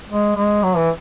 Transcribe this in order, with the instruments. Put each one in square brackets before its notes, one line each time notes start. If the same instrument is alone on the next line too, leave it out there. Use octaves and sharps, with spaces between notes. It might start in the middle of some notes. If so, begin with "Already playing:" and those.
[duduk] G#3
G#3
F#3
E3